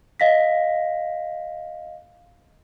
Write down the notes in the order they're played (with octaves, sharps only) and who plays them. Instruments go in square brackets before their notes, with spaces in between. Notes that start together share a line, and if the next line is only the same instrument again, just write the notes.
[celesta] D#5 F5 A#6 B6